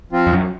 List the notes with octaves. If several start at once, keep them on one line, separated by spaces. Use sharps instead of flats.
F3 C4 F4
F2
F#2